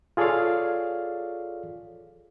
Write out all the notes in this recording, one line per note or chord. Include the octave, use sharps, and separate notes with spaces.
F4 G#4 A4 C#5 D5 F5